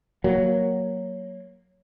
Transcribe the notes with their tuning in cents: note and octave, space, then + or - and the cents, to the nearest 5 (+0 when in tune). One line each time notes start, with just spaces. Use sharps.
F#3 +0 A#3 +0